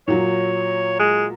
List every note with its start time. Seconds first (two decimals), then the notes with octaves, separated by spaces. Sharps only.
0.08 A#2 F#3 C#5
0.99 G#3